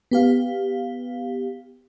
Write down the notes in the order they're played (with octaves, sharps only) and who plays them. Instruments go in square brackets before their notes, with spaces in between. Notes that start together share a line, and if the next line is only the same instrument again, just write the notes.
[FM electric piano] B3 G4 F5